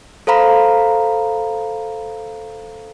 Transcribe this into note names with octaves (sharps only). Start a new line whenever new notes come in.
A4 C5 F5 A#5 B5